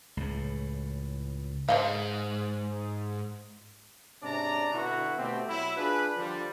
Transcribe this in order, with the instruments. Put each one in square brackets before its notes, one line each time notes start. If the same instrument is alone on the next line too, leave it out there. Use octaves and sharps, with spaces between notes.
[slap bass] C#2 A2
[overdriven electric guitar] G#2 [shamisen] C5 D#5 F5
[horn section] G#2 C3 C#4 D4 D5 A#5
B2 D3 B3 E4 F#4
B2 A3 B3 C4 G4
F#3 E4
D4 F4 G#4 B4
D3 F3 G3